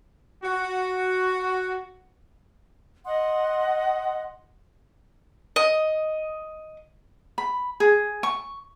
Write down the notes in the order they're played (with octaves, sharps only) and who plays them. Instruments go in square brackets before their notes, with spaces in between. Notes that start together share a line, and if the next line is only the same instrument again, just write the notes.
[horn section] F#4
[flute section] D#5 F#5 C6 D#6
[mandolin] D#5
[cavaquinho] B5
G#4
C#6